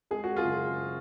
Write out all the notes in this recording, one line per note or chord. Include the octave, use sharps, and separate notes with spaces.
G#3 G#4
F#4
F4 G#4
F#1